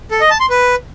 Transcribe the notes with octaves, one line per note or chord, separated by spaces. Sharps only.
A4
D#5
A5
C6
B4